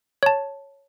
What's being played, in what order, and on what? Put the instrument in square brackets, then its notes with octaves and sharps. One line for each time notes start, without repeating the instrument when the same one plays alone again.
[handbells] C#5 A5